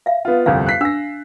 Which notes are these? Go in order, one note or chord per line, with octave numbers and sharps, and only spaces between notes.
E5 F5
B3 F4
G1 C2 F2 F5
F#6 B6 C7
D4 E6 A#6